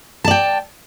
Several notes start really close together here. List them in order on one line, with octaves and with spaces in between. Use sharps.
A5 D5 G5